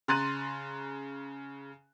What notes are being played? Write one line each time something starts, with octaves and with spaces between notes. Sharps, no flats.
C#3 A#5 C6 F#6 A6 D#7